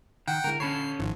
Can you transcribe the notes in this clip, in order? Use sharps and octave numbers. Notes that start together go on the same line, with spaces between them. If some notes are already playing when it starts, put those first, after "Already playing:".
D#3 F#5 G5
D3 G#3 E4 A#4
D3 C#4 A4 C#5 B5 C7
G#1 D#3 F3